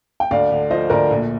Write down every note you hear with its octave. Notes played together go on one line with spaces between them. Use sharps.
G5
D2 D5 F5
D3
F3 C5 D#5
D2 A#4 D5
A#1